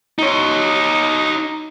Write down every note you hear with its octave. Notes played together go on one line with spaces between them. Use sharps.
D#4 C#5